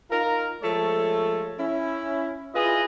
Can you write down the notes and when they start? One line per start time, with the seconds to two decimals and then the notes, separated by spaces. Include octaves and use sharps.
0.11 D#4 F4 A#4
0.62 F3 G#3 A3 A4 C#5
1.58 C#4 E4
2.55 E4 F4 G#4 B4 D#5